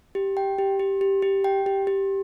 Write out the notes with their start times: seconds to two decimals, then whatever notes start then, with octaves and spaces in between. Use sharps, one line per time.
0.15 G4
0.37 G5
0.58 G4
0.79 G4
1.01 G4
1.22 G4
1.44 G5
1.66 G4
1.87 G4